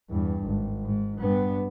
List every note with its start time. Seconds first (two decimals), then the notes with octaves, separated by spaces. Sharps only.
0.10 E2 G2
0.43 G#1
0.85 G#2
1.20 G2 B3